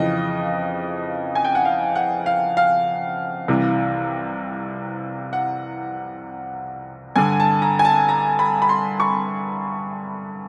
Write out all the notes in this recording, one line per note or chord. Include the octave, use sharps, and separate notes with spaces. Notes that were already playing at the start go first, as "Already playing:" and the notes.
Already playing: F2 C#3 E3 D#5
G#5
G5
F#5
F5
F#5
F5
F5
C2 C3 E3
F#5
G2 D3 G#5
A5
A#5
G#5
A5
A#5
B5
B5
C6
C#6